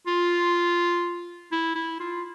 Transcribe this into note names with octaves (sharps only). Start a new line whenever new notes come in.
F4
E4
E4
F4